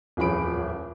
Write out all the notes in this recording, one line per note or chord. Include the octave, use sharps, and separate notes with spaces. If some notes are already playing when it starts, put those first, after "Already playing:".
D#1 A1 F2 G#4 B5 D7